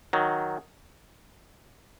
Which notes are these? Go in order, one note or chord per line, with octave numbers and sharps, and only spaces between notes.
D#3 F#3